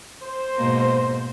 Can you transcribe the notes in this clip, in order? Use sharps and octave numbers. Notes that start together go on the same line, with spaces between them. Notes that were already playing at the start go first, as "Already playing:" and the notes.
C5
G#2 B2 A#3